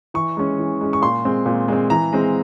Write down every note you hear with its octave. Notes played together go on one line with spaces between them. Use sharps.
E3 C#6
G#3 C#4
E3
G#3 C#4
C#6
A#2 C6
G#3 C4
A#2
G#3 C4
E3 A#5
G#3 C4